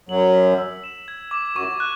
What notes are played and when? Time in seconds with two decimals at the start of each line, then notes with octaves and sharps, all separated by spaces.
0.09 F#2 F#3 F#7
0.34 B6
0.58 E6
0.84 E7
1.08 G#6
1.31 D6
1.56 F#2 F#3 C#6
1.80 F#6